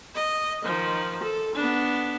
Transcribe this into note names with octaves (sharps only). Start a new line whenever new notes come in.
D#5
D#3 F3
A4
B3 D4